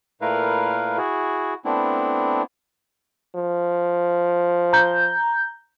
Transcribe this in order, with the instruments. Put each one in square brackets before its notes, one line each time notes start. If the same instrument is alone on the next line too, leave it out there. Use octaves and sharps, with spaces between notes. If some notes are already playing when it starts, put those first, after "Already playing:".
[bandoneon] A#2 A3 E4 A#4 B4 F5
E4 F#4 G#4
A3 B3 C4 D4 E4
[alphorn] F3
[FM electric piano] A#5 G6